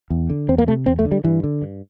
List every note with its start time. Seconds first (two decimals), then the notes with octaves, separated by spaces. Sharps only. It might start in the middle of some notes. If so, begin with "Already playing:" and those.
0.10 E2
0.30 D3
0.48 E2 C4
0.58 A#3
0.67 C3 A3
0.86 E2 C4
0.99 A3
1.05 D3
1.12 G3
1.24 G2 E3
1.44 D3
1.62 G2